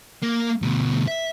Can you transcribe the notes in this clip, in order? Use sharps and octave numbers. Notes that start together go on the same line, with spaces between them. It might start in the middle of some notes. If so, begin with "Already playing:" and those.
A#3
D2 B2
E5